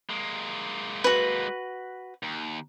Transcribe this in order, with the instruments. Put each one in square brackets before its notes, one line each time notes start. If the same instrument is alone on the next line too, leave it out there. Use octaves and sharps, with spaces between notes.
[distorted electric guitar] G#3 A#3
[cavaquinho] F#4 B4
[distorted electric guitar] D#2